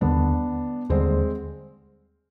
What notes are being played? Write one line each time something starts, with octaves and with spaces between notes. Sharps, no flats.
D#2 D3 G3 B3 D4
D#2 D3 G3 G#3 C4